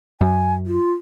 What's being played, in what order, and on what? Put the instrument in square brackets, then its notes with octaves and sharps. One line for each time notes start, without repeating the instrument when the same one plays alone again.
[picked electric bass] F#2 [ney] G#5
[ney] F4